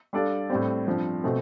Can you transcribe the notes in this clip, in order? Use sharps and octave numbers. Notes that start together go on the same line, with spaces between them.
G3 D4 A4 D5 F5
A2 G3 C4
G2 F3 C4
B2 A3 C4